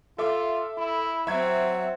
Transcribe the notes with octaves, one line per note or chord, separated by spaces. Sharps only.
F4 A4 E5 D6
E4
F#3 C4 E5 F#5 G#6